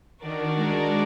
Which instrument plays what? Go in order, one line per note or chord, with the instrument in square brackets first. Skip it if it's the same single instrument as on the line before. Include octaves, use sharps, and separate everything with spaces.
[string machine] D#3 [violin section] D4 F#4 A#4 D5
[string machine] G#3